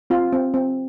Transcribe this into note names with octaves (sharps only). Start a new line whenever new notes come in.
C4 F4
C4
C4